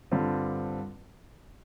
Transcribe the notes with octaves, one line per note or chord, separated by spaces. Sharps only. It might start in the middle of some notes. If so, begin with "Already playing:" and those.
G2 D3 G3 C4 F4